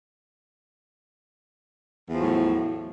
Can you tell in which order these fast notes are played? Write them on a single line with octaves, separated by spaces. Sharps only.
E2 F3 F#3 A2